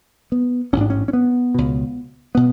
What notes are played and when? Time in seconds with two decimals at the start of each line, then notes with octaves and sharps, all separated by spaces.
0.32 B3
0.73 A1 C#4
0.77 G#2 D4
0.90 C#4
1.08 C#4
1.13 B3
1.54 C#2 B2
2.35 B2 B3